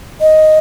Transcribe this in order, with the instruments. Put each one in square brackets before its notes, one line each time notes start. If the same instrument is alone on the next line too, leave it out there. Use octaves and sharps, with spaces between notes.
[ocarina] D#5